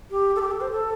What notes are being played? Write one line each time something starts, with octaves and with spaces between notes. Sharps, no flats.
G4
A4
G4
A4
C5
A4